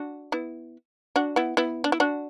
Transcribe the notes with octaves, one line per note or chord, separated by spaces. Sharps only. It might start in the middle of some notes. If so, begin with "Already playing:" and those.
Already playing: D4 F#4
B3 E4
D4 F#4
B3 E4
B3 E4
D4
E4
D4 F#4